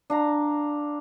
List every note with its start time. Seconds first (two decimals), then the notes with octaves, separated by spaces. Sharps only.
0.10 D4 F5 A#5